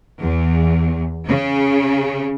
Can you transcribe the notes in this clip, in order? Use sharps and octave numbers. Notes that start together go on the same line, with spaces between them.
E2
C#3